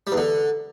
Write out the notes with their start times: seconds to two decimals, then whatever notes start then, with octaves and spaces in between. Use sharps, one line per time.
0.07 G3
0.12 E2
0.17 D3